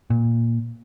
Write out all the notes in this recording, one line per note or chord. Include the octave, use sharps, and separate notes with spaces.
A#2